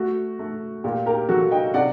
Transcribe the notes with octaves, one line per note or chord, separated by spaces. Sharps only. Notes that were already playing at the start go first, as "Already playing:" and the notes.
Already playing: A3 F#4
A3
A#2 G4
G4 A#4
F#3 F#4 A4
D#5 G5
C3 D5 F#5